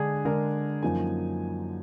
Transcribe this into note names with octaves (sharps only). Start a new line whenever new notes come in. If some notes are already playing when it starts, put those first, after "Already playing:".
Already playing: D3 G#3 D4 G#4
D3 G#3 D4 A#4
F#2 F3 A#3 D#4 G#5